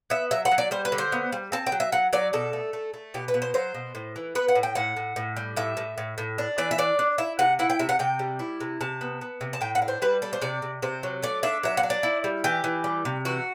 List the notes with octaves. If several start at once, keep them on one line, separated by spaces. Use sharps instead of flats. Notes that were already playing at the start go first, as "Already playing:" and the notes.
B3 E5
F#3 E5
F#5
F#3
D5
G3 C5
B4
D3
C5
B3
G3
C4 A5
G5
F#3
E5
F#3 F#5
F#3 D5
B2 A4
A3
A3
A3
B2 G4
B4
B2
C5
F#3 C5
B2
A2
E3
B3 B4
F#5
A2
G5
A2 F#5
A2
A2
G3
A2 E5
A2
A2
A2
D4
E3 D5
E5
D4 D5
D4
E4 E5
C3 F#5
E4 F#5
G5
C3 E5
F#5
C3 G5
G3
E4
C3
C3 A5
B3
B3
C3
A5
A2 G5
F#5
D4
C5
G3 B4
D4 A4
C5
C3 D5
C3
C3 C5
F#3
A3 D5
D4 E5
F#3 E5
F#5
D4
D5
E4
G3
E3 G4
E3
G3
C3
E3 F#4